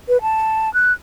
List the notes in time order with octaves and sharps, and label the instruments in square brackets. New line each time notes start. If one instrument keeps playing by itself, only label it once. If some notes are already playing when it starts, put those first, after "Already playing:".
[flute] B4
A5
F#6